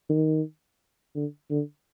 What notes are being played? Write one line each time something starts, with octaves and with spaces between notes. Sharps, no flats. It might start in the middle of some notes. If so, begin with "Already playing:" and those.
D#3
D3
D3